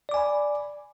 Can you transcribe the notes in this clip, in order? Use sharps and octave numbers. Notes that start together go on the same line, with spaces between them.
D5 G#5 B5 D6